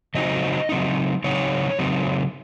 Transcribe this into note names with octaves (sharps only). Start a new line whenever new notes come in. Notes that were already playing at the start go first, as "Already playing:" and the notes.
C#3 F#3 C4 D#4 D#5
C#3 F#3 C4 D#4
C#3 F#3 C4 D#4 C#5
C#3 F#3 C4 D#4